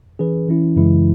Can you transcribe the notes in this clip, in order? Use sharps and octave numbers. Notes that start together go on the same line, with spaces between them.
E3 C#4 G#4 B4
E3 C#4 E4
F#2 C#3 E3 G#3 E4